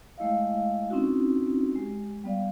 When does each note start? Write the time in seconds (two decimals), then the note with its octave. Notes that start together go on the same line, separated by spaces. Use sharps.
0.18 G#3 A3 E4 D#5 F5
0.90 C4 C#4 D#4 E4 F#4
1.76 G#3 G4
2.24 G3 B3 D5 F5